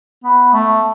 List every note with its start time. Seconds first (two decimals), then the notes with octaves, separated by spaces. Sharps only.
0.24 B3
0.54 A3